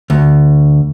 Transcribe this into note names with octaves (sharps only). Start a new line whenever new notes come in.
D2